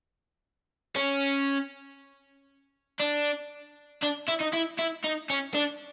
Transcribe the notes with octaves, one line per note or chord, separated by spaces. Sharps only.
C#4
D4
D4
E4
D#4
E4
E4
D#4
C#4
D4